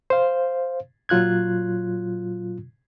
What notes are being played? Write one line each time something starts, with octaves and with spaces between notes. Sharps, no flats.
C5 F5
A#2 F#3 F4 F#6 G#6